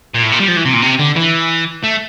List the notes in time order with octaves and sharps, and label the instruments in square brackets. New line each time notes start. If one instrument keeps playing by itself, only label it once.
[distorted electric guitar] A#2
A2
A#2
G3
F3
E3
C3
A#2
C3
D3
E3
A3